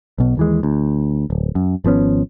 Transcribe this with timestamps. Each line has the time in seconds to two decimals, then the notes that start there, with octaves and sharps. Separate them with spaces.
0.18 B1 B2
0.37 D#2 E3 G#3
0.63 D2
1.30 D1
1.55 F#2
1.84 G#1 F3 B3 C#4